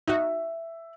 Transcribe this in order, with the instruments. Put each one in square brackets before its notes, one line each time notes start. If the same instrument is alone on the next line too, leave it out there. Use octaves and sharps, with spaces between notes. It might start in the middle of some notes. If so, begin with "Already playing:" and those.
[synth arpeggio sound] D#4 F#4 [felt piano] E5